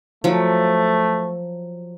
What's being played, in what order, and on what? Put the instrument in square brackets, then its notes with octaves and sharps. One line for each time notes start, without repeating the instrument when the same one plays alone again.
[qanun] F3 F#3 [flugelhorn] A3